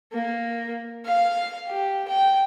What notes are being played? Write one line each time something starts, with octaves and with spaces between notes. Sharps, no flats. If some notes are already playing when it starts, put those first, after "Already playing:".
A#3
F5
G4
G5